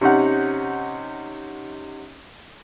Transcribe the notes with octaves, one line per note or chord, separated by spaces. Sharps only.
C3 C#4 D#4 F#5